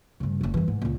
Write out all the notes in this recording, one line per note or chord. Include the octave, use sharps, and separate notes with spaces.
G2 C#3
F#1 C#3
G2 E3
G#2
C#2 A#2